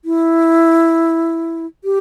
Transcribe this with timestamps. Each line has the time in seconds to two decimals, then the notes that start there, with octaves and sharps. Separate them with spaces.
0.05 E4
1.84 G4